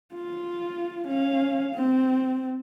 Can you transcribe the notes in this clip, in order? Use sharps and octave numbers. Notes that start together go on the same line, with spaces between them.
F4
C#4 F5
C4